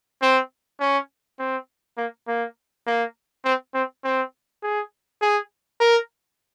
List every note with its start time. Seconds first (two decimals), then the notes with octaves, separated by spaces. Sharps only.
0.22 C4
0.80 C#4
1.39 C4
1.97 A#3
2.28 A#3
2.86 A#3
3.44 C4
3.74 C4
4.04 C4
4.63 G#4
5.21 G#4
5.80 A#4